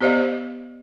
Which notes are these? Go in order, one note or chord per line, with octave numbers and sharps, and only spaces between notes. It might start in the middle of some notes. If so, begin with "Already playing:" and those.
B3 G4 C5 D5 D#5 F5